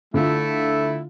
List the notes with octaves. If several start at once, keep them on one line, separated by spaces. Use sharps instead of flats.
D3 A3 E4 F4